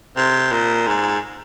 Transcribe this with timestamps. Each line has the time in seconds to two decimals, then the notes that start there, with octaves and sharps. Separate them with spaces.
0.17 C3
0.52 A#2
0.87 G#2